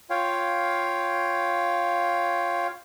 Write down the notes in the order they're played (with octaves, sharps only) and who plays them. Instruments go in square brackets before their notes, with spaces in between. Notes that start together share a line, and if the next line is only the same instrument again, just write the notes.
[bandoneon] F4 C#5 F5 G5